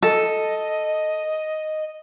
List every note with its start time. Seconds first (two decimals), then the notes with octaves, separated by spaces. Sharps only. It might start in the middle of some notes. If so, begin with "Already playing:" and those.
0.03 A4 D#5